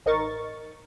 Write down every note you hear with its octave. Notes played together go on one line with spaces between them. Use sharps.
A1 D#4 A#4 C#6 A6